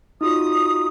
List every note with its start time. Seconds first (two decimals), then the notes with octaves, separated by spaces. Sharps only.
0.21 D#4 F4 F#4 D#6